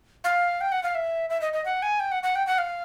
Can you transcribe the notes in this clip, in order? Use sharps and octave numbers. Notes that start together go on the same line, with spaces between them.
F5
G5
F#5
F5
E5
E5
D#5
D#5
F#5
G#5
G5
F#5
F#5
G5
F#5
F5